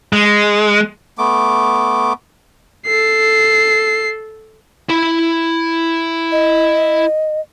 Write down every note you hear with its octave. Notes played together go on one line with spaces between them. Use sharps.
G#3
A3 B3 D6
A4 C7
E4 B5
D#5